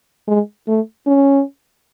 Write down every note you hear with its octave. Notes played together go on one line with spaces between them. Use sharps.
G#3
A3
C#4